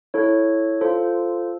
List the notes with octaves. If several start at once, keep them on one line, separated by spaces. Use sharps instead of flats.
E4 A4 C#5
F4 A4 C5